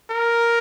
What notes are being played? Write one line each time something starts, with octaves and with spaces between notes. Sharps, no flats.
A#4